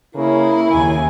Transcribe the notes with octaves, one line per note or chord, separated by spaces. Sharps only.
C#3 A#3 E4
D#2 C#3 G#5